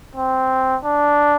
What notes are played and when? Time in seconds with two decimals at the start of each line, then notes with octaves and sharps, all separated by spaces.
0.15 C4
0.84 D4